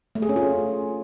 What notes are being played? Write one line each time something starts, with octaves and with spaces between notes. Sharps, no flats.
A3
G#4
C#4
F4